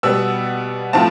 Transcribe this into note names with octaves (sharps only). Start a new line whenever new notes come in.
B2 G3 B3 E6
A2 F3 C4 A5